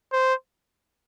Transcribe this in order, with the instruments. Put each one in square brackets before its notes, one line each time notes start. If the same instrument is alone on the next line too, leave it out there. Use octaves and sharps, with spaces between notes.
[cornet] C5